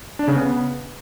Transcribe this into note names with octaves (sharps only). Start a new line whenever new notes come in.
D4
C#3
B3